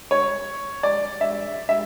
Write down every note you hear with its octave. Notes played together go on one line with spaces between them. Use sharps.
C#5
D5
E5
E5